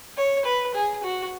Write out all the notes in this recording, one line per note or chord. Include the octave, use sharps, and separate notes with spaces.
C#5
B4
G#4
F#4